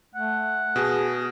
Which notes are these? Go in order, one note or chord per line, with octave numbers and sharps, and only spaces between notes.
A3 F#5
B2 G#4